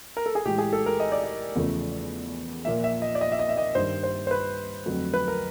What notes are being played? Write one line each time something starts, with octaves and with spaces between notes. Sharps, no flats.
A#4
A4
G#4
A2 E3 G#3 G4
G#4
A4
A#4
D#5
D5
D#5
E2 C#3 F3 A3
A#2 F3 A#3 E5
E5
D#5
D5
D#5
E5
D#5
E5
D#5
G2 D#3 G3 C5
C5
C5
B4
F2 D3 F#3 A3
B4
A#4